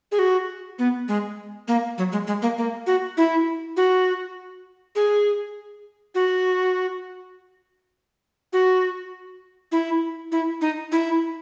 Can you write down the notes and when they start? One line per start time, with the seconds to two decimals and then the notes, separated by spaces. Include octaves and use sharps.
0.12 G#4
0.19 F#4
0.79 B3
1.08 G#3
1.68 A#3
1.98 F#3
2.12 G#3
2.27 G#3
2.42 A#3
2.58 A#3
2.87 F#4
3.17 E4
3.77 F#4
4.96 G#4
6.15 F#4
8.53 F#4
9.72 E4
10.32 E4
10.61 D#4
10.92 E4